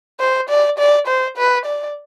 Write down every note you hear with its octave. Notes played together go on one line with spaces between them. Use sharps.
C5
D5
D5
C5
B4
D5